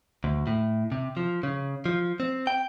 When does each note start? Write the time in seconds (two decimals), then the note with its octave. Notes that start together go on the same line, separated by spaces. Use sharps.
0.24 D2
0.47 A2
0.92 C3
1.17 F3
1.43 C#3
1.86 F3
2.20 C4
2.47 G5